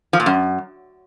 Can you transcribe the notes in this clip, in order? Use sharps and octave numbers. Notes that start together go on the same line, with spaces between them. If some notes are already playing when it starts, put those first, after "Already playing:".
F3
A#2
F#2